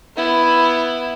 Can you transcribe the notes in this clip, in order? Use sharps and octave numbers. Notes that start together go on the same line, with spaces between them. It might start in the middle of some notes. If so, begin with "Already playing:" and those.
B3 E4